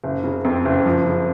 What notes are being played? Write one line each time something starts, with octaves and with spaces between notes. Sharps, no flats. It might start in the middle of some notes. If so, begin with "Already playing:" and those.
F#1
C#3
F2
F#1
F3
C#3